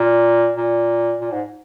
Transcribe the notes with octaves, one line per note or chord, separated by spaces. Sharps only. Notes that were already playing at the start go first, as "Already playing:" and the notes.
Already playing: A#2
A#2
A#2
G#2